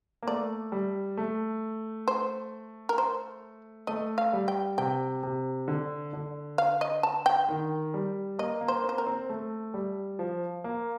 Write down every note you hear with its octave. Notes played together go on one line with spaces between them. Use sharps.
A#3
A3 D5
G3
A3
C5
A#4
C5
A3 D#5
F5
G3
G5
C3 G5
C3
D3
D3
F5
D#5
A5
G5
D#3
G3
A#3 D#5
A#3
C5
C4
C5
A#4
C4
A3
G3
F3
A#3